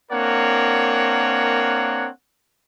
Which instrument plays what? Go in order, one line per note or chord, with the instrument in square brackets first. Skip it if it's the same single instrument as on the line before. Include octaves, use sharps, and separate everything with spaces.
[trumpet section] A#3 C4 D4 A#4 C#5 F#5